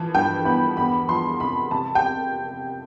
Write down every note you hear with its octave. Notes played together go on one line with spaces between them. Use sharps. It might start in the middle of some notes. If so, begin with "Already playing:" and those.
Already playing: E3 F3
G2 G5
B3 B5
E2 B5
F3 C6
C3 B5
C3 A5
G5